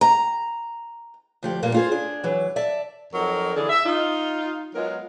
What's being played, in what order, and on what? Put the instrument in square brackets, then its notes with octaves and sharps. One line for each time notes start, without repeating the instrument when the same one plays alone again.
[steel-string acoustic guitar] A#5
D2 F3 G4
G2 A#2 A#3
F4 G#4 C5
D4 G#4
E3 F#3
D5 E5 A5
[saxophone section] F2 F#3 D#4 A#4
D3 E3 G#4
E5
D#4 F4
F#3 G#3 B3 F4 A#4